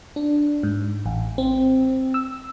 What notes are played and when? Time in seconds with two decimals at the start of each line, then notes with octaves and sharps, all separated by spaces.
0.16 D4
0.63 G#2
1.06 A1
1.38 C4
2.14 E6